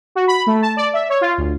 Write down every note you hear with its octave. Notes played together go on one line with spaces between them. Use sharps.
F#4
B5
A3
A5
D5
E5
C#5
F4
D2